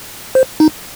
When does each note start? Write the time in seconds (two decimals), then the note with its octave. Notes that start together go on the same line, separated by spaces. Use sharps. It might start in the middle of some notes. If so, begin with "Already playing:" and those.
0.35 C5
0.60 D#4